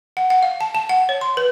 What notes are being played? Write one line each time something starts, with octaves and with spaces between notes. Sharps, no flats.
F#5
F#5
F5
A5
A5
F#5
C#5
C6
B4